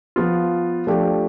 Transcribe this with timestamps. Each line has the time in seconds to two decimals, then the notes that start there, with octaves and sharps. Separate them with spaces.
0.16 F3 B3 F4
0.87 F3 A3 D4 G4